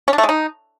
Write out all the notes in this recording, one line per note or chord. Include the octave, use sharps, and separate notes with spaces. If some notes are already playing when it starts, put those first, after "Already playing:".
C#4
D4
A3
G#3
D#4